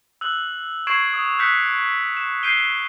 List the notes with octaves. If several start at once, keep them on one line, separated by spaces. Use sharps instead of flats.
E6 F#6 F#7
C#6 G#6 C7 D7 E7 F#7
D#6
D#6 E6 F#6 G6 B6 C#7
E7
G6 C7 D7 D#7 G7